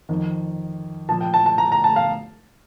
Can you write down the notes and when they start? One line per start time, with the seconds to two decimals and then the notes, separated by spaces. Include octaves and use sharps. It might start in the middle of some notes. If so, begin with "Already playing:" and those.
0.09 F2 D#3
1.09 F3 A5
1.11 A#2
1.21 G5
1.34 A5
1.46 A5
1.58 A#5
1.72 A#5
1.84 A5
1.96 F5